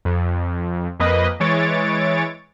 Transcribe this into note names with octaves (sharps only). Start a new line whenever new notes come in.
F2
F2 A#3 B4 D#5
E3 G#3 C#5 A6 D7